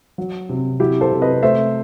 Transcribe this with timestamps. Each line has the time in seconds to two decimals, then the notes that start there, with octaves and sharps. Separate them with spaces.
0.18 F#3
0.49 C3
0.80 F#3 E4 G4
1.01 A4 C5
1.12 C3
1.22 B4 D#5
1.43 A3 C5 E5